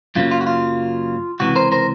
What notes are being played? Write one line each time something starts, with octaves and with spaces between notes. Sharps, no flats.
F#2 C#3 F#3 A#3 F4
F4
F#4
F4
C#2 C3 E3 F#4
A#4 C5
A#4 C5